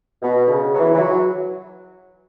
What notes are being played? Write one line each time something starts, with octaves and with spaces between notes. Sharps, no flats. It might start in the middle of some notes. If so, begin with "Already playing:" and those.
B2
D3
C#3
F#3
E3
E3
F#3